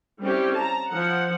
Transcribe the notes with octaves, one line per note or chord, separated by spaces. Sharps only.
G3 C4 C#4 E4 G4
A5 A#5
F3 F#5